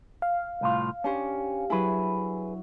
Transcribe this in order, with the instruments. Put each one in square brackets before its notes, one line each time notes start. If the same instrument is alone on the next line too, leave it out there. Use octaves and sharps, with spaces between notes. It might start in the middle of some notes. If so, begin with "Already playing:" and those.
[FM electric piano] F5
[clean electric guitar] C2 A2 F4
[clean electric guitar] C#4 [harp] D4 G4 C5
[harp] F#3 E4 [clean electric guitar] G#4 B4